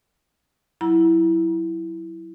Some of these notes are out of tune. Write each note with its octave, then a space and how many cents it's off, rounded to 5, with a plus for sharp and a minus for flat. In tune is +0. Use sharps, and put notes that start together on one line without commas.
F#3 +0 E4 +0 A#5 +40